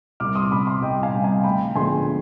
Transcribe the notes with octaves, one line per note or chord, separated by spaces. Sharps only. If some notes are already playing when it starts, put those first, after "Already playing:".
C2 D6 F6
C6 D#6
C3 G3 B5 D6
C6 D#6
C2 D#5 G5
F5 G#5
C3 G3
F5 G#5
D2 G5 B5
D3 F3 G#3 B3 G#5 C6